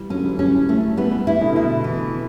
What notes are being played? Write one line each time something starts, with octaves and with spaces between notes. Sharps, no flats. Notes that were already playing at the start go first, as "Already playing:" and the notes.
Already playing: E3 G3
D3 F#3 C#4
E3 G3
E3 G3 C#4
A3
E3 G3 B3
E3 G3
E4
B2 D3
B2 E4
E3